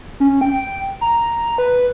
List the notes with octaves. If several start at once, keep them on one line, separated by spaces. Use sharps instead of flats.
C#4
G5
A#5
B4